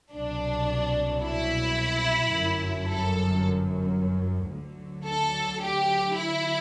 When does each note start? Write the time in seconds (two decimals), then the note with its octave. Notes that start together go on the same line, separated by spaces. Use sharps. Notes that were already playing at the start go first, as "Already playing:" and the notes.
0.12 C2 B2 F#3 D4
1.23 E4
2.32 G1 F#2 F#3
2.87 A4
4.51 D2 D3 F#3
5.07 A4
5.62 G4
6.16 E4